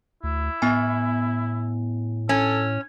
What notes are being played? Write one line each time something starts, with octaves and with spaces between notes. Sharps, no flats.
D2 E4
A2 B3 G#5
C#4 A4